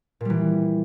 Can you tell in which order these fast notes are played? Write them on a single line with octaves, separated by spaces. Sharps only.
A#2 G3 E3